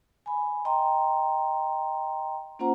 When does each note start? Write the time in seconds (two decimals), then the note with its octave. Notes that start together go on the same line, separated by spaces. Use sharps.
0.26 G#5 B5
0.65 D#5 G5 A#5 C6
2.59 A#3 C#4 F4 C5 F#5 A#5